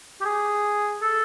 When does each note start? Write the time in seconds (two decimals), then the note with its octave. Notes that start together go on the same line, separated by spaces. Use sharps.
0.20 G4
0.25 G#4
1.01 A4